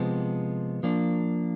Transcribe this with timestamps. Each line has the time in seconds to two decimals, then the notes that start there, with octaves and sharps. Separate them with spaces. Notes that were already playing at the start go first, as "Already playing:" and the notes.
Already playing: C3 F3 G#3 B3
0.83 F3 A#3 D4